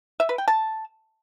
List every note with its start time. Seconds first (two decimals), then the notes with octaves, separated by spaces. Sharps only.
0.20 E5
0.29 B4
0.38 G5
0.48 A5